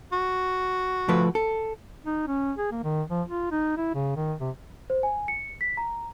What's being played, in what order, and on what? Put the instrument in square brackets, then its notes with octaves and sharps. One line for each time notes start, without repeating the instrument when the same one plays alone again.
[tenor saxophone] F#4
[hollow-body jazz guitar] F3 A3 B4
A4
[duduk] D#4
C#4
G#4
A#3
D#3
F3
F4
D#4
E4
C#3
D#3
C3
[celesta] C5
G#5
C#7
B6
A#5